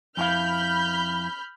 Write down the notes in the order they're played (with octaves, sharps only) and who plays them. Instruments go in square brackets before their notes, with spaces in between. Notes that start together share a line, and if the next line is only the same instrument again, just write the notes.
[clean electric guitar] F2 E4 F5 [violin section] B5 F6 G6